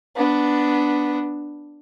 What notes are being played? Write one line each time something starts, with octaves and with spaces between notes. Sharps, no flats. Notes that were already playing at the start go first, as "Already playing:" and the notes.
B3 D4